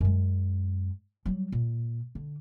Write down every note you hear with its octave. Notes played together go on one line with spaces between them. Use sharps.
F#2 G#3
F#3 G3
A#2
D3